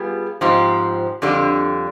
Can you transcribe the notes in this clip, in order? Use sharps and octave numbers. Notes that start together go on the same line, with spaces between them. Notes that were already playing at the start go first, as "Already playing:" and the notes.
Already playing: G3 B3 F4 G#4
G#2 F3 C4 G4
F2 D3 G3